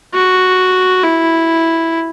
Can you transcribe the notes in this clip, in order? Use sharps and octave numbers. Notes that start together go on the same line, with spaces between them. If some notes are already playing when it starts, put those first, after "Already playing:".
F#4
E4